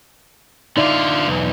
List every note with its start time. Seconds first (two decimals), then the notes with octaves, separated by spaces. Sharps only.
0.77 D3 D#4 F4 D5 E5
1.27 B1 E2